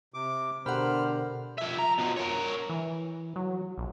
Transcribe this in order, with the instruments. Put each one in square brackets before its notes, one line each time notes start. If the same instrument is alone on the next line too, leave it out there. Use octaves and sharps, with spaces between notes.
[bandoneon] C3 D6
[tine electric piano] B2 G4 A#4 [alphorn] D3 [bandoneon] C5 F6 [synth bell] F#5 B5
[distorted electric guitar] F3 E5
A#5
B2 F3
A#4 C#5
[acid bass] E3
F#3
A#1